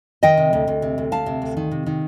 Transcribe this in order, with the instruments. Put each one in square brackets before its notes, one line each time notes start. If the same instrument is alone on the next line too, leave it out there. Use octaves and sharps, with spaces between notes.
[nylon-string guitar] D#3 D#5 G5
C3
D2
D2
C3
D2
D2 F5 A5
C3
D2
D#3
C3
D#3